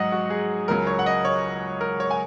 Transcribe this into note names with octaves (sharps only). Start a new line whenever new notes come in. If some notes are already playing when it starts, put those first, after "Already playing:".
Already playing: G#2 F#3 D#5 F#5
F#4
G#4
C#2 C#3 F#3 A#4
C#5
F#5
D#5
C#5
A#4
C#5
G#5